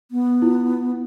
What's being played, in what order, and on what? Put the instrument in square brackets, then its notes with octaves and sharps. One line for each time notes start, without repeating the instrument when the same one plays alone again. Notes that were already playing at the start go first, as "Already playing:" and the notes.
[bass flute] B3
[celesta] E4 F4